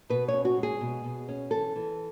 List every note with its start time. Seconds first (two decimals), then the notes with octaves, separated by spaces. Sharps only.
0.10 B2 B4
0.28 C#5
0.34 C#4
0.45 F#4
0.58 G#3
0.63 G#4
0.81 B2
1.04 B2
1.28 C#4
1.51 E3 A4
1.76 E3